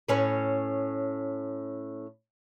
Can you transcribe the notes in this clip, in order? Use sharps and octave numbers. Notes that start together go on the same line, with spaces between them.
A2 C#4 B4